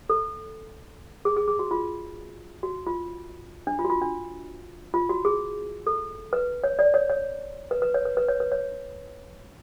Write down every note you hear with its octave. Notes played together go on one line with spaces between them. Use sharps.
A4
G#4
G#4
G#4
F#4
F4
F#4
F4
D4
F4
F#4
F4
D4
F4
F#4
G#4
A4
B4
C#5
D5
C#5
C#5
B4
B4
C#5
B4
B4
C#5
B4
C#5